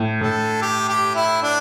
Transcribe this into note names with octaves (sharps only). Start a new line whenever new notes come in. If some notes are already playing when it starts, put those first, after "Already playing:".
Already playing: A2
A2 A4
G4
G4
E4
D4